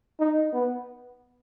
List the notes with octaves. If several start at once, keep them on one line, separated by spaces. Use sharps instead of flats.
D#4
B3